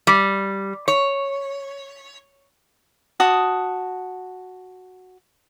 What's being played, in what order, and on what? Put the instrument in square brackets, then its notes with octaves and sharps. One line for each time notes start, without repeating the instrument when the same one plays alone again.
[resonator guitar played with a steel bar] G3
C#5
[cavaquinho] F#4 A5 D#6